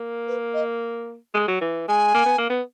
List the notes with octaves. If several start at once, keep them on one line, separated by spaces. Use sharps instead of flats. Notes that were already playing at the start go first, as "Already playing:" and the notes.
Already playing: A#3
B4
D#5
G#3
F#3
E3
G#3 G#5
A#3
B3
A#3
B3